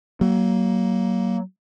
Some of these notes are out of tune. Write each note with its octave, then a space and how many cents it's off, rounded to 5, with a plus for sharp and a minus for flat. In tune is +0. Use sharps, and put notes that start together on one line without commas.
F#3 +30 A#3 +5